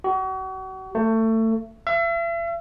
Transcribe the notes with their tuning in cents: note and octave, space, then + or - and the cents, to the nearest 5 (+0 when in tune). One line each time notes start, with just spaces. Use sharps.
F#4 +40
A3 +25
E5 +40